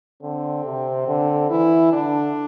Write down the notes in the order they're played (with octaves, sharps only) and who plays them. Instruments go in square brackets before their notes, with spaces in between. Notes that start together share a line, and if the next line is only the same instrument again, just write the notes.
[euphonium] D3 [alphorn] C4
[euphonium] C3
D3
[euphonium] E3 [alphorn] E4
[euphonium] D3 [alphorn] D4